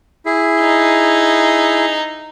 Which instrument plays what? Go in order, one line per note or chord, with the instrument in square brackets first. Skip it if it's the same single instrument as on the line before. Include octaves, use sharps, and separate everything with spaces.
[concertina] E4 G#4
[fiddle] D#4